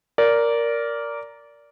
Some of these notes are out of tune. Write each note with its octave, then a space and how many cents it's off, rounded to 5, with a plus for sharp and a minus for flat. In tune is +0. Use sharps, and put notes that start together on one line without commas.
A#4 +0 D5 -15